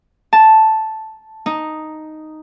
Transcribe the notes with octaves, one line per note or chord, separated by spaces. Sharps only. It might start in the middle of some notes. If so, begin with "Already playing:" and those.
A5
D#4